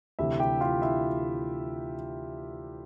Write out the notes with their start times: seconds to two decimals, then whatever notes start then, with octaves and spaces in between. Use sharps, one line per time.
0.19 D2 C3 E3 E4 E5
0.40 G4 G5
0.61 F4 F5
0.82 E4 E5